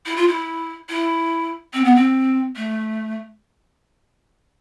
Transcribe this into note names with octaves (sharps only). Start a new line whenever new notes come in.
E4
F4
E4
E4
C4
B3
C4
A3